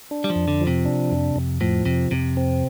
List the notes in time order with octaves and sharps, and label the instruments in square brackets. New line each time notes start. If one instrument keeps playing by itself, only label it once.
[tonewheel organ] D4
[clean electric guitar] G3
F3
[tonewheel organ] F2
[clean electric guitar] D3
[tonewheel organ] F3
[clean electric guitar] C3
[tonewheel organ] D4
F2
F2
[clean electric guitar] A2 [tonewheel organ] F3
[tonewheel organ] F2 [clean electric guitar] C3
[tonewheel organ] F2 [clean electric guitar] C3
[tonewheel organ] C4